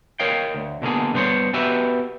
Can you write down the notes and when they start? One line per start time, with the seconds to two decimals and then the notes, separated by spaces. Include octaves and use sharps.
0.20 A#4 C#5 D#5 F5 G5
0.55 D2
0.82 B2 D3 A#3 G#4
1.13 G2 B3 C5 C#5
1.54 B3 F#4 G4 B4 E5